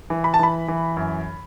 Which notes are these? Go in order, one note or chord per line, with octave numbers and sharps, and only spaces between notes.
E3
B5
A5
E3 B5
E3
F#2